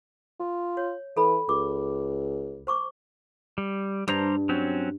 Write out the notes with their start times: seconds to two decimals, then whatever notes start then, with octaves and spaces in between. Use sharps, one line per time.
0.40 F4
0.77 C#5
1.17 E3 A4 B5
1.49 C#2 D6
2.67 C5 C#6 D6
3.58 G3
4.08 G2 G3 C5 A#5
4.49 F#3 C4 C#4